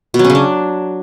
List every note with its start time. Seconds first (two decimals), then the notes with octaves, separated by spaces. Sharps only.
0.14 B2
0.19 F#3
0.24 C#4
0.30 C#3
0.35 D4